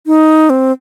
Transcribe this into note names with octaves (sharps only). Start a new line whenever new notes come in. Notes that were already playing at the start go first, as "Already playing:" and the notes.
D#4
C4